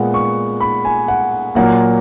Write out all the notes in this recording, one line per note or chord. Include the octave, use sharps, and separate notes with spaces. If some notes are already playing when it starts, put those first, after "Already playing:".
Already playing: A#2 G#3 B3 F#5
C#6
B5
G#5
F#5
A#2 F#3 A#3 F#5